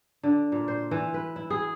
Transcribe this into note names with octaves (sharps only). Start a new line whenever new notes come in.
D3
A#2
C5
E3
B4
E4
G#4